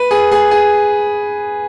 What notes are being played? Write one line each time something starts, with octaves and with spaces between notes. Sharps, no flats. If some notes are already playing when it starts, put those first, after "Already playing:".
Already playing: B4
G#4
G#4
G#4